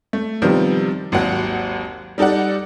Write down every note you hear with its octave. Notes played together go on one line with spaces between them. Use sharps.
A3
C3 D#3 F3 G3 B3
G#1 D#2 F#3 F#5
G3 D#4 A4 D5 F#5